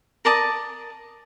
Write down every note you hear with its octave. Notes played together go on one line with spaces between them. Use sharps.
A#4 D5 A5 D#6